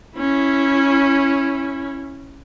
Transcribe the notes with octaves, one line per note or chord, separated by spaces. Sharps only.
C#4 E4